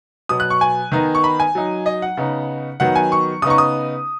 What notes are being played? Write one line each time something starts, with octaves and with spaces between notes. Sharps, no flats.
B2 F#3 B3 D#6
F#6
C#6
G#5
D#3 B3 D#4
C#6
B5
G#5
F#3 D#4
D#5
F#5
C#3 B3 D#4
D#3 F#3 B3 F#5
G#5
C#6
C#3 B3 D#4 C#6 D#6
D#6